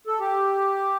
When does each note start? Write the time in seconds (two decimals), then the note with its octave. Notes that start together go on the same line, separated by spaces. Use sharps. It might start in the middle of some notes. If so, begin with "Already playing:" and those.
0.07 A4
0.20 G4